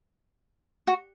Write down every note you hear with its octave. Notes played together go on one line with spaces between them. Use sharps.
F#4